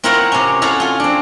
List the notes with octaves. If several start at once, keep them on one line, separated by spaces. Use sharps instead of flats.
C4 E4 F4 A#4 C#5 F#5
C3 C#4
E4 F#4 A4 C#5 E5 F5
F4 G#4
C4 D4